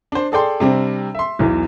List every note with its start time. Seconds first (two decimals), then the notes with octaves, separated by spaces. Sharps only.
0.12 D4 C5
0.32 G#4 A4 D5 G5 C6
0.60 C3 G3 C4 D4
1.15 E5 C6
1.39 B1 E2 E3